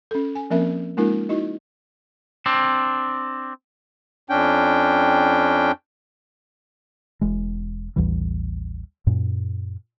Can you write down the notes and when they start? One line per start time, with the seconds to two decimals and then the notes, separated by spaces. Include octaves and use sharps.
0.11 C#4 A4
0.35 G#5
0.50 F3 A#3 C4 C#4 A#4 E5
0.97 G#3 A#3 C#4 D#4 F4 A#4
1.29 D#4 E4 F#4 D#5
2.46 C4 D4
4.30 F2 C#4 D4 G5
7.21 E1 E2 G#3
7.96 A1 D#2 E3 G3
9.07 F#2 A#2